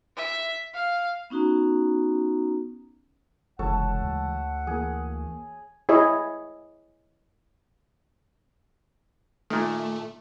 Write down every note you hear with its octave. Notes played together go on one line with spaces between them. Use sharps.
E5
F5
B3 C#4 D#4 F#4 A#5
F1 C#3 E3 G#3 A4 C#5 F#5 A5
D2
E3 A#3 G#4
E4 G#4 C#5 D#5
A#2 D#3 A3